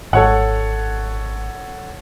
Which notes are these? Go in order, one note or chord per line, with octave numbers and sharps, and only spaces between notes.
G#1 A4 C#5 F#5